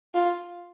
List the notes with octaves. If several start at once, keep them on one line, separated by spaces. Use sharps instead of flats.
F4